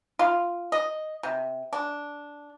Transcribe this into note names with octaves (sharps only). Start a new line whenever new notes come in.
F4
D#5
C3
D4